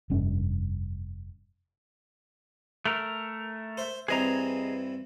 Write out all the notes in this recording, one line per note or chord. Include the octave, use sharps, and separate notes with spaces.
F1 G2 C#4
A3 A#4
C5 E5
G2 E3 C4 G#4 D#5 A#5